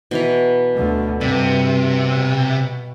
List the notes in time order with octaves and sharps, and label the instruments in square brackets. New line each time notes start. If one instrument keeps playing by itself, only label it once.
[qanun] B2 E3 A#5
[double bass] D2 D3
[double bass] G2 [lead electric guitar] C3 [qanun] D5
[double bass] B2